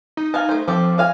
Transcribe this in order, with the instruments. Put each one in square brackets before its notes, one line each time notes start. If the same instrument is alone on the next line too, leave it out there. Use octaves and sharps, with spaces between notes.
[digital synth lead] D#4
[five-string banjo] F5 G#5 A5
A3 C5
[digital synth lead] F3 [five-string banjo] C4 G4 A4
[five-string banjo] G#3 F5 G#5